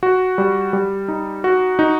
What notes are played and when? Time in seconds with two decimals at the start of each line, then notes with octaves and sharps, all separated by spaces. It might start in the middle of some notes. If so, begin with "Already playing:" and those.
0.03 F#4
0.38 G3
0.73 G3
1.08 D#4
1.44 F#4
1.79 D#4